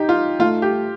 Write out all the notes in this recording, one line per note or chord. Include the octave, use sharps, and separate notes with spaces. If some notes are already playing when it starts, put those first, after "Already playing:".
Already playing: D#4 G4
F4
A3 F4
G4